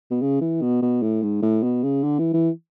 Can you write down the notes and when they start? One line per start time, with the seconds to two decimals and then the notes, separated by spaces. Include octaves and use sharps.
0.11 B2
0.21 C#3
0.41 E3
0.62 B2
0.82 B2
1.02 A2
1.23 G#2
1.42 A2
1.63 B2
1.83 C#3
2.04 D3
2.19 E3
2.34 E3